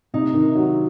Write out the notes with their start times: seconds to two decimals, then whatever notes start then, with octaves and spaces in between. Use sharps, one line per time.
0.14 C3 D#4
0.34 D#3
0.55 F#3